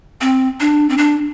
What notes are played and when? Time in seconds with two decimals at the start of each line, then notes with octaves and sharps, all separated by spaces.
0.21 C4
0.60 D4
0.90 C4
0.98 D4